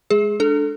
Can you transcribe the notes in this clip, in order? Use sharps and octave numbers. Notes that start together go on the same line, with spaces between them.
G#3 G#4
D4 A4